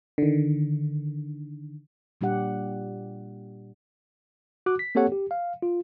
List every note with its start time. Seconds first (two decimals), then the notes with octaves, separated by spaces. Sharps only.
0.18 D3 D#3
2.21 A#2 G3 D4 G4 F#5
4.66 F#4 D6 F#6
4.79 B6
4.95 A#3 C4 G4 A4 C#5 F#5
5.12 G4
5.31 F5
5.62 F4